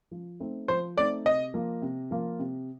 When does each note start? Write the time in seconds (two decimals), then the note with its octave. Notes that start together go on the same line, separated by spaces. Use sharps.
0.11 F3
0.40 A3 C4 D#4
0.68 F3 C5
0.97 A3 C4 D#4 D5
1.25 C3 D#5
1.54 F3 A#3 F4
1.82 C3
2.11 F3 A#3 F4
2.39 C3